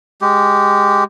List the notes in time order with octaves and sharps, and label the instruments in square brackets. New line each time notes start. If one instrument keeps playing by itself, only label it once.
[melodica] G#3 G4